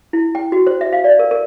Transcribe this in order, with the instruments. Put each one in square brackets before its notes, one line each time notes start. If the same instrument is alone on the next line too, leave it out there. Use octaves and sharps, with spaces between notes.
[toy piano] E4
G5
F#4
C5
E5
F5
D5
A#4
A#4